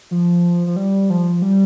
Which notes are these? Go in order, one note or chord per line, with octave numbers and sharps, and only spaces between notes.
F3
F3
G3
F3
G3